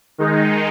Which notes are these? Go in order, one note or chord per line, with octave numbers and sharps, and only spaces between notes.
D#3 G#3 D#4